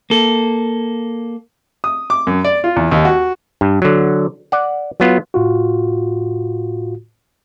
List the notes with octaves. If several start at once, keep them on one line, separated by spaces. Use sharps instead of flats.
A#3 A4
D#6
D6
F#2
D5
F4
E2
D#2
F#4
G2
D3 F#3
D5 F#5
F#3 B3 F4
A2 F4 F#4